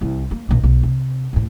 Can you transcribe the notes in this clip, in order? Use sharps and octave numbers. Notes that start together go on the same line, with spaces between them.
C2 E4
A#3
A#1 D#3
B1
C3
D#2 A2